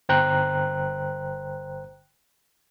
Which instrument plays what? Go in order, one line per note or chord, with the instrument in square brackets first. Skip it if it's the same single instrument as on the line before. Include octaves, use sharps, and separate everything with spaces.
[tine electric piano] G1 C5 G5 A#5 F#6